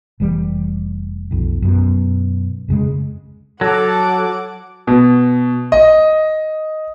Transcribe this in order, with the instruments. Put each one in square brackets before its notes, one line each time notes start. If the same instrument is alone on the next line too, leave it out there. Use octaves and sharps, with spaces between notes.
[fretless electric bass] F1 E3 G3
B1 F2
F#2 B2
F2 C#3 G#3
[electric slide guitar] F#3 [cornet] A4 [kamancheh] F#5 D6
[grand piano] B2
D#5